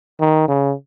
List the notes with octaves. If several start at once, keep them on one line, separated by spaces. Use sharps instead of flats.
D#3
C#3